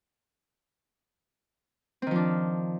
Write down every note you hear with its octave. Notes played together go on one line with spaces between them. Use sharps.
D#3 F3 C4 D4